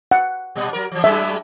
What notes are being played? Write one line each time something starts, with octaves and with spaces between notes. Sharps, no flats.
F#5
A#2 G3
F#3 A#4
E3 F3
G2 F#3 G#3 E5